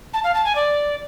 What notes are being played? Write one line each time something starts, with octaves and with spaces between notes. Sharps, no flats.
A5
F5
A5
G#5
D5